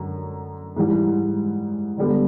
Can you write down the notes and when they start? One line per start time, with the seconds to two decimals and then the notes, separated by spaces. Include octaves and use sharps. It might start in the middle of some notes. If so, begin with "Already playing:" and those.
Already playing: F#2 D3 F#3
0.76 G#2 E3 G3
1.98 D3 G3 B3